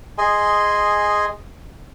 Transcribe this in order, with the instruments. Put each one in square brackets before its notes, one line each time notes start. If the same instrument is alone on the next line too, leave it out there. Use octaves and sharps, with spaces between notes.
[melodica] G#4 D#5 G#5 C6